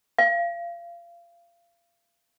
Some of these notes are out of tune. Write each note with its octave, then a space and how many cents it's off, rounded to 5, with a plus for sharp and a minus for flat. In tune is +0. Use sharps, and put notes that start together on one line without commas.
F5 -30